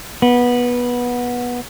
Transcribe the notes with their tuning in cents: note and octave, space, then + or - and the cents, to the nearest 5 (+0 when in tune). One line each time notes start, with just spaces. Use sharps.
B3 -15